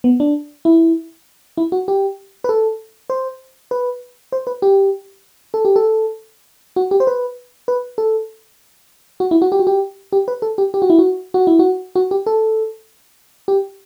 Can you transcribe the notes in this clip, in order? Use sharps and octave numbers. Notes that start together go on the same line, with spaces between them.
B3
D4
E4
E4
F#4
G4
B4
A4
C5
B4
C5
B4
G4
A4
G4
A4
F#4
G4
C5
B4
B4
A4
F#4
E4
F#4
G4
F#4
G4
G4
B4
A4
G4
G4
F#4
E4
F#4
F#4
E4
F#4
F#4
G4
A4
G4